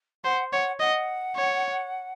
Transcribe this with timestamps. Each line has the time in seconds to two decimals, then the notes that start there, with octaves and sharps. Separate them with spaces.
0.24 C5 F#5
0.52 C#5 F#5
0.80 D#5 F#5
1.36 C#5